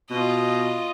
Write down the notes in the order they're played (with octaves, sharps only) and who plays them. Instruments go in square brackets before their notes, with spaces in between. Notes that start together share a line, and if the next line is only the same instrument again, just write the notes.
[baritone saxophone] B2 [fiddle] F4 D#5